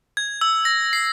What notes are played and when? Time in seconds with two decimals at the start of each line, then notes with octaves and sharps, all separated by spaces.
0.17 G#6
0.41 E6
0.65 A#6
0.93 C7